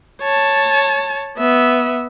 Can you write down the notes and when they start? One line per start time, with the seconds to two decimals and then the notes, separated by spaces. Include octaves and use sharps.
0.22 C#5 A5
1.38 B3 E5